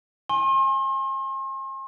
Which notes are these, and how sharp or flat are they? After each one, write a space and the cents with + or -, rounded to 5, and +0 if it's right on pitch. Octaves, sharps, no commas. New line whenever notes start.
G#5 +0 C6 +40